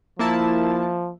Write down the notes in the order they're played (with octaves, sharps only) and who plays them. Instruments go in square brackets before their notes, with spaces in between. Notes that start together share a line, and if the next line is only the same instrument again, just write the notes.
[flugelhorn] F3 [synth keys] A#3 E4 A5